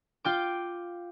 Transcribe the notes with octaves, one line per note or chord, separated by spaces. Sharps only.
F4 G5 D6